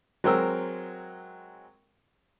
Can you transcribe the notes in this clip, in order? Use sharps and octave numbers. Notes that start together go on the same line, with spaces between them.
F#3 G#3 C4 A#4 G5 E6